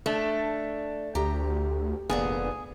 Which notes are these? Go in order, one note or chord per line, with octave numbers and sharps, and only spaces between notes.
A3 D4
D2 G4 A#5
F1 A#2 D3 B3 G#4